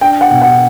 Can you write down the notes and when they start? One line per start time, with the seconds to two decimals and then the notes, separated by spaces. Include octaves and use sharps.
0.01 D4 G5
0.21 F#5
0.31 B2
0.42 F#5